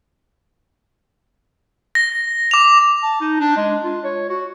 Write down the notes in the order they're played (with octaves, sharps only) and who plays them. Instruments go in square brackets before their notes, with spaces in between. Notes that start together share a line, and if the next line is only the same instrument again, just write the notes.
[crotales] A#6
D6 F7
[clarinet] A5
D#4
D4
G#3
F4
C#5
F#4